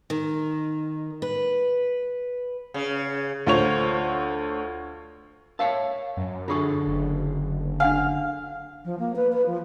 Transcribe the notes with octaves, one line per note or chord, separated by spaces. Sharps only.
D#3
B4
C#3
D2 F4 C5 C#5 F7
A#4 C#5 E5 F5 A5
F#2
D3 F4 G#4 A4 C#6
F#1
D4 F5 F#5 G#5
F3
A#3
B4
B4
F3